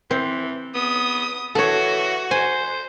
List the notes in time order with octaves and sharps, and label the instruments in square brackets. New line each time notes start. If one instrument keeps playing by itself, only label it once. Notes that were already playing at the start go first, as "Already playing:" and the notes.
[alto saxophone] E3 [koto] C4
[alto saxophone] B3 [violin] D#6
[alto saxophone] E3 [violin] F#4 [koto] A4 C#5
[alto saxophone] C5 [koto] G#5